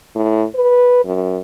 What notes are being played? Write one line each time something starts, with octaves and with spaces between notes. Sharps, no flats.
A2
B4
F#2